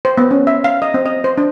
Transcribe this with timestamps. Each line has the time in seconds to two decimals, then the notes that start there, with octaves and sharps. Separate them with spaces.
0.05 C5
0.18 B3
0.31 C#4
0.47 E5
0.64 F5
0.82 D#5
0.94 C4
1.06 D#5
1.24 C5
1.38 D4